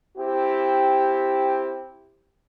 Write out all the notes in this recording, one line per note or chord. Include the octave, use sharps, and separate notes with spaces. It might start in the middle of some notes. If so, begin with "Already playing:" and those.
C4 E4 G4